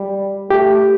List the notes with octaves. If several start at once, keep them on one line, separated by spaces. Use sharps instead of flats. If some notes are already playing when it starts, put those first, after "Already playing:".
Already playing: G3
A3 G4